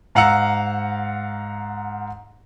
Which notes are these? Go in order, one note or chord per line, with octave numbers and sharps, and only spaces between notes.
G#2 F5 F#5 A#5 E6 C#7